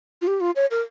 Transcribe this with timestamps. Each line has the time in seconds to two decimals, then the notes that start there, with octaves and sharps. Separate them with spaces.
0.22 F4
0.27 G4
0.41 F4
0.56 C#5
0.71 A#4